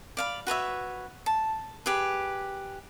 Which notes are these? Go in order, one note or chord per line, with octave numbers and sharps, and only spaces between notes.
D5 F5 B5
F#4 B4 C#5 E5
A5
G4 G#4 B4